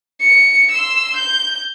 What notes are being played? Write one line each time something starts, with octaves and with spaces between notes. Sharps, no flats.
C#7
C6 E6
G6